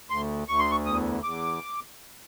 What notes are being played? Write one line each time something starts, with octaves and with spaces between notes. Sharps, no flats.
D2 C6
D2 C#6
C6
C#6
E2 D#6
E2 D6